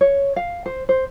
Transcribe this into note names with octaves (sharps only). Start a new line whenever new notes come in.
C#5
F5
C5
C5